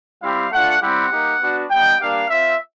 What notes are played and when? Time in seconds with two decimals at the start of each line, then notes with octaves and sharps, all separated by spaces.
0.22 G3 C4 E4 G4 F5
0.51 A3 D4 F4 F#5
0.81 G3 C4 E4 G4 F#5
1.11 A#3 D#4 G4
1.40 B3 D4 F#4
1.70 G3 B3 D#4 G5
2.00 G3 A#3 D4 G4 F5
2.29 C4 F4 E5